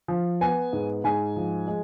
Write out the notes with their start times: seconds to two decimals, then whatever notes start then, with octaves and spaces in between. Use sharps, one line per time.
0.08 F3
0.41 B3 G#5
0.73 G#2
1.04 G#2 G#5
1.36 F3
1.68 G#3